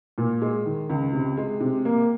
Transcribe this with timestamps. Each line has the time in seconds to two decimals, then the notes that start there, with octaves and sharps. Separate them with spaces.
0.18 A#2
0.42 G#3
0.66 D#3
0.90 C#2
1.13 C3
1.37 G#3
1.60 C3
1.85 A#3